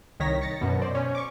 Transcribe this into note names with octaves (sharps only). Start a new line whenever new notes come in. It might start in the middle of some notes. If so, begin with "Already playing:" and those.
C2 D#3 C#5 A#6 B6
A6 A#6 C#7
F#2 B2
C5 D5
C#4
C#6 D6